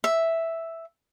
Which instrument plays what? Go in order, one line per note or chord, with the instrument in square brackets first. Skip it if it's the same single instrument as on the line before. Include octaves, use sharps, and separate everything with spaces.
[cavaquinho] E5